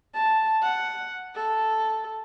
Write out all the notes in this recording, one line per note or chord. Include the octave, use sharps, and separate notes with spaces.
A5
F#5
A4